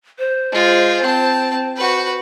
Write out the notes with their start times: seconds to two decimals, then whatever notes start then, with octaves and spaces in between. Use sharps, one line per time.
0.19 C5
0.52 G#3 F4
1.03 C4 A5
1.76 F#4 B4